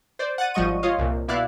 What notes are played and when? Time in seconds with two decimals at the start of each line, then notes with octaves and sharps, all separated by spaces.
0.19 C5 D5
0.38 F#5 F#6 A6 D#7
0.54 G#1 F3 G3 D#5 C#6 D#7
0.83 F4 C#5 D#5 F5
0.99 C2 A#2
1.28 B2 E4 D5 F5 F#6